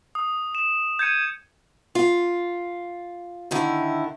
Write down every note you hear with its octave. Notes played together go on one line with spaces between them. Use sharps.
D#6
E7
G6 G#6 C#7 D#7
F4
D3 D#3 E4